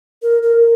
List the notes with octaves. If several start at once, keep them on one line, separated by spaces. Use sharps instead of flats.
A#4
A#4